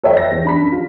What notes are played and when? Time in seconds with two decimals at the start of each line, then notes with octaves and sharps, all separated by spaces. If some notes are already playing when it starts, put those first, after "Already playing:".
0.03 A4 B4 C#5 D#5 E5 G5
0.17 A#6
0.31 E2
0.45 D4 B5 B6
0.60 F#2
0.72 F4